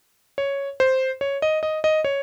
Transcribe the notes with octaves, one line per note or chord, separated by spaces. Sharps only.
C#5
C5
C#5
D#5
D#5
D#5
C#5